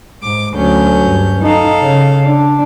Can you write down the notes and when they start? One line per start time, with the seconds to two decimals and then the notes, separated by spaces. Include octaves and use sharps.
0.22 G#2 D6
0.55 D2 F#3 C#4 G6
1.02 G2
1.43 D#4 A4 F5
1.82 C#3
2.26 D4